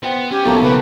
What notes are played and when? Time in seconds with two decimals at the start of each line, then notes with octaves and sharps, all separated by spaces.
0.03 B3 C5 G5 C6
0.31 C#4 G4
0.45 B1 F#3 A3 A#3 F4 C#5
0.63 C#3 B4